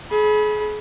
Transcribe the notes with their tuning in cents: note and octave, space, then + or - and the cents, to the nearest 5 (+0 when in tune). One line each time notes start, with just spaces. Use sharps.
G#4 +35 B5 -15